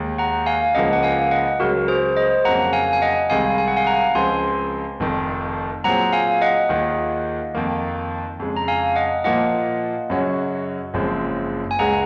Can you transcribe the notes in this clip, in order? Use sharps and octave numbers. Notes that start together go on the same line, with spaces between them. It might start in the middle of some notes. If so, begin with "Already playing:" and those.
Already playing: D#2 D#3 G#3
F#5 A#5
F5 G#5
C#2 C#3 F3 A#3 D#5 F#5
F#5
F5 G#5
D#5 F#5
C#2 C#3 F#3 F#4 A#4
G#4 C5
C5 D#5
F2 C#3 F#3 A#3 F#5 A#5
F5 G#5
G#5
D#5 F#5
C2 C3 D#3 G#3 F5 G#5
G#5
F#5
F5 G#5
F#5 A#5
C#2 C#3 F3 C4 F4 G#5 C6
F1 F2 D#3
A#2 F#3 C4 F4 G#4 F#5 A#5
F5 G#5
D#5 F#5
D#2 D#3 A#3 F4 G#4
F2 D#3 A#3
F2 C#3 G#3
A#5
F5 G#5
D#5 F#5
A#2 F3 A#3 F4 D#5 F#5
F#2 C#3 F#3 C#4 F#4
F#1 F#2 F3 G#3 C4
G#5
C#2 C#3 G#3 F#5 A#5